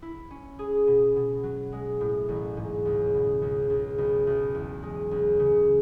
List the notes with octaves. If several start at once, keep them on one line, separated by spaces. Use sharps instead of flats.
E4
C#4
G#4
B2
B2
F#3
G#3
A2
A1
G#2
C#2
B2
C#2
C#2
B1
B1
E2
G#3
C#2
C#3